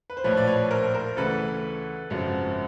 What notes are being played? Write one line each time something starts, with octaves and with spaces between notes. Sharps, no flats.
B4
C5
A#1 A2 F3 B4 C#5
D5
B4 C#5
A#4 C5
A#4 C5
D2 C#3 E3 A4 B4
G#1 F#2 C#3 F3